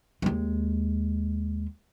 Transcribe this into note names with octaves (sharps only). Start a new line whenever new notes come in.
D#2 G#3